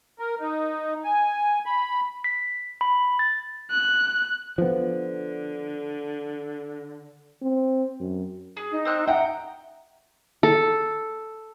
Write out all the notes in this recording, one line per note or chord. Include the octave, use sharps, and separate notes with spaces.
A#4
D#4
G#5
B5
B6
B5
A6
F#6
D3 F3 B3
C4
F#2
G#4
D#4
C4 C5 F#6
E5 F#5 G5 A#5
A4